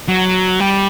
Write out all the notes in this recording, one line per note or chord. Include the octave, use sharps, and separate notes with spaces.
F#3
G3